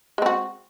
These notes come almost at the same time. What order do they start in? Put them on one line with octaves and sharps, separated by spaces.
G#3 C4 F#4